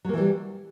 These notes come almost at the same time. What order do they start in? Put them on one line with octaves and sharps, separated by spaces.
F#3 A#3 E3 G3